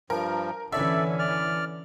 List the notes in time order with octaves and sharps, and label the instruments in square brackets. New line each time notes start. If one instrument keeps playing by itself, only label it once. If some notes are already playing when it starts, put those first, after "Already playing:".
[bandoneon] G2 F3 [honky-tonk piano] A#4
[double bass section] D3 E3 C#4 [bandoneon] A4 D5 [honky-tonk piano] E5
[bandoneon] D5 F6